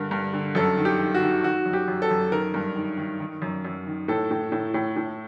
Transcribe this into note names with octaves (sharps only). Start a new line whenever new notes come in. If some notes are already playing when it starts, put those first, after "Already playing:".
Already playing: G2 D3 A#4
G2
D3
F#2 A4
D#3
G4
D#3
F#4
D#3
D#3 F#4
F#2
G4
F#2
A4
F#2
D#3 A#4
G2
D#3
D#3
D#3
F#2
F#2
D#3
A2 A4
A2
A2
A2
A2